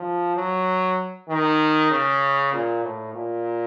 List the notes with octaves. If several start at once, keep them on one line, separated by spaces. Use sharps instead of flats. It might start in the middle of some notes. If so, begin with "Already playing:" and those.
Already playing: F3
F#3
D#3
C#3
A#2
A2
A#2